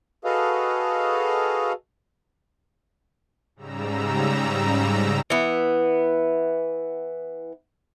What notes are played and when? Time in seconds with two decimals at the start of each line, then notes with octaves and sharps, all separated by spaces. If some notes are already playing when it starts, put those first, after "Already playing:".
0.25 F#4 G#4 A4 B4 D#5 F5
3.56 G#2 C#3 G3 A#5 E6
5.30 E3 B3